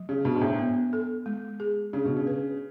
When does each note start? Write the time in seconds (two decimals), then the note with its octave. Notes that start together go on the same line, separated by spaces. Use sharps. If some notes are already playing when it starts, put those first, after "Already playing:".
Already playing: F#3
0.09 C#3
0.25 B2 D4
0.36 G#2
0.41 A2
0.58 B3
0.93 A4
1.26 G#3
1.60 G#4
1.93 C#3 D4
2.05 B2
2.17 C#3
2.27 B4